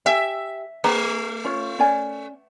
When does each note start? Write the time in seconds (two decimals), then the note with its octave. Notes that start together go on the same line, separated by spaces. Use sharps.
0.06 G4 E5 G#5
0.84 A3 G#4 A#5
1.44 C#4 F4 C#5
1.79 C#4 D5 G#5